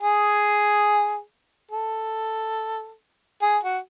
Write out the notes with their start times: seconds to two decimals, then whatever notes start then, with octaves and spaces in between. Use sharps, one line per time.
0.01 G#4
1.71 A4
3.42 G#4
3.63 F#4